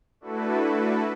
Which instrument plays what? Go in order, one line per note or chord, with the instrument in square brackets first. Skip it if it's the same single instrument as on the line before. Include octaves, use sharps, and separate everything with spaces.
[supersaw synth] A3 D4 E4 F#4 A4 B4